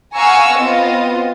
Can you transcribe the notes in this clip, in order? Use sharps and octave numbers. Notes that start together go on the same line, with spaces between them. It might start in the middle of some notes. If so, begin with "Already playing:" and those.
F5 F#5 G#5 A#5 C#6 E6
B3 C4 F4 D#5